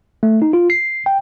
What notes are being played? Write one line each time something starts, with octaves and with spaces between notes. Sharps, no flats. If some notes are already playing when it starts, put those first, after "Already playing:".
A3
D#4
F4
C7
G5